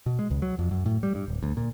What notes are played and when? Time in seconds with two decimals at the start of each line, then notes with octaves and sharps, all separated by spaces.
0.06 B2
0.19 G#3
0.31 C#2
0.42 F#3
0.59 F2
0.71 F#2
0.86 A2
1.03 G3
1.15 G2
1.28 D1
1.43 D2
1.57 A#2